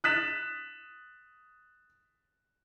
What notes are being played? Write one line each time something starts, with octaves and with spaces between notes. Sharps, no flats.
D#6 F#6 A6 B6 E7